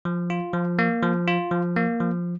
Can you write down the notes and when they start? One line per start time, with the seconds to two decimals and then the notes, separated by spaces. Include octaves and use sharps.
0.05 F3
0.30 F4
0.54 F3
0.79 A#3
1.03 F3
1.28 F4
1.51 F3
1.76 A#3
2.00 F3